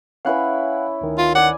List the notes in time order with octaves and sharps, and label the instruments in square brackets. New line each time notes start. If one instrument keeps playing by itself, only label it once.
[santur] C#4 E4 B4 [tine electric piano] F5 F#5 F#6
[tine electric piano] D2 D#3
[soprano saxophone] F4
[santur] D5 G#5 [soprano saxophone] F#5